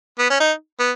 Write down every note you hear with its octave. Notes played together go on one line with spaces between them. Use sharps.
B3
C#4
D#4
B3